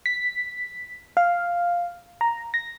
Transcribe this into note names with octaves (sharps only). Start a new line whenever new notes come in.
B6
F5
A#5
A#6